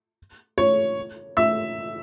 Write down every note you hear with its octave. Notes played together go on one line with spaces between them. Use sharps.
C#5
E5